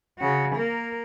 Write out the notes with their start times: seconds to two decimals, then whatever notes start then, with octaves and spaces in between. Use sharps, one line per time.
0.19 C#3 F#4
0.55 A#3 A#4